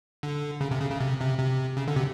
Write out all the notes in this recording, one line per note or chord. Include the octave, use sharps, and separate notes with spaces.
D3
C#3
C3
C#3
C#3
C3
C3
C3
C#3
D3
C3